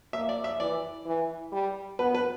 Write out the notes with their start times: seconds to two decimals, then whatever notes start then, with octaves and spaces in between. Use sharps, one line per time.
0.13 A#3 E5
0.29 D5
0.44 E5
0.60 E3 D5
1.06 E3
1.52 G3
1.99 B3 B4
2.15 B4